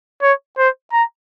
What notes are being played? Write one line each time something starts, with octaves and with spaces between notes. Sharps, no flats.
C#5
C5
A#5